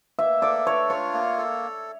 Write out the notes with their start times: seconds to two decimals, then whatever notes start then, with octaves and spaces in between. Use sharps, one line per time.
0.19 A#3 E5
0.42 A4 D5
0.66 D4 C#5
0.89 F4 C#5
1.13 A#3
1.38 A4